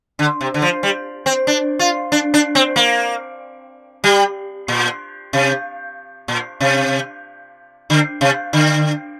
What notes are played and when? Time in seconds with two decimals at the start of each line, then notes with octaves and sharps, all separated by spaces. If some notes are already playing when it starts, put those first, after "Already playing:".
0.19 D3
0.41 C3
0.54 D3
0.62 F3
0.83 G3
1.26 C4
1.47 D4
1.79 F4
2.12 D4
2.34 D4
2.55 C4
2.76 A#3
4.04 G3
4.68 A#2
5.33 C3
6.28 A#2
6.61 C3
7.90 D3
8.21 C3
8.53 D3